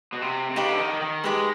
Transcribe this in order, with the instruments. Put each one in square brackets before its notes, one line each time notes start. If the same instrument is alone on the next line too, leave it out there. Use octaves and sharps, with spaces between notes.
[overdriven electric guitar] B2
C3
C3
[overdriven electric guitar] C#3 [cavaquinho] D#4 G4 B4
[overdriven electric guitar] D3
D#3
D#3
[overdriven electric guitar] G#3 [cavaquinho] D#4 G4 B4